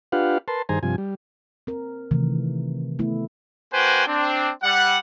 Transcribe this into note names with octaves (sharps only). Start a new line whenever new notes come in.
D4 F4 G4 B4 F5 F#5
A#4 B4 A5 C6
G2 D#3 G#4 C5 G#5 A#5
G2 C3 F3 G#5
G3
C4 A#4
C3 D#3 E3 A3
A3 B3 E4
A#3 F#4 B4 C5 G5 G#5
C4 D4
G3 F#5